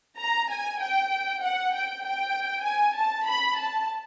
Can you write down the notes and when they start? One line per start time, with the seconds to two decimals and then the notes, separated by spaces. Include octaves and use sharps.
0.20 A#5
0.50 G#5
0.81 G5
1.43 F#5
1.73 G5
2.04 G5
2.65 G#5
2.96 A5
3.27 B5
3.58 A5